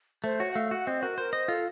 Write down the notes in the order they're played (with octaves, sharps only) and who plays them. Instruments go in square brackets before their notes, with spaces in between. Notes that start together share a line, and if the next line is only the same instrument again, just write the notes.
[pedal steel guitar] A3 [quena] C5
[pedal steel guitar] F#4 [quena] C#5
[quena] F#5
[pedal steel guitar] A3 [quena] F5
[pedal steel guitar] F#4 [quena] F#5
[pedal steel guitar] C4 [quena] D#5
[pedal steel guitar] F#4 [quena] A#4
[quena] A#4 [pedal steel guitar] C5
[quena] C5 [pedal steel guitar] D#5
[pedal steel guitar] F4 [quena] A4